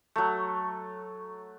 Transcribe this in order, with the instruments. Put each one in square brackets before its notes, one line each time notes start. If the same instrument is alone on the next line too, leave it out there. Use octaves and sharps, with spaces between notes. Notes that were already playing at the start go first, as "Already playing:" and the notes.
[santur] F#3 A3